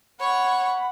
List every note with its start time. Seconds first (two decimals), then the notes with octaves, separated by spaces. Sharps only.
0.20 C#5 F#5 B5 C#6